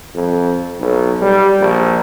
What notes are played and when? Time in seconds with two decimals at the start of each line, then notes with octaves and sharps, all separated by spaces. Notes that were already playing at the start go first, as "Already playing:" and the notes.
0.15 F2
0.80 B1
1.22 G3
1.60 A#1